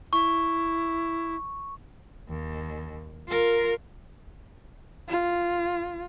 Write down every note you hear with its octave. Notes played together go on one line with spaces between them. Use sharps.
E4 C#6
D#2
F4 A#4
F4